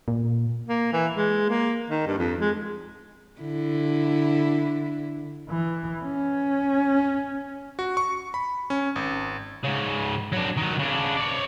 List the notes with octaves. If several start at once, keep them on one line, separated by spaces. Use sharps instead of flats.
A#2
A#3
E3
G#3
A#3
D#3
G2
F2
G#3
D3 E4
E3
C#4
F#4
C#6
B5
C#4
G#1
G#2 C#3
F#3 D4
D#3 F#3
C#3 D4
C#5 D5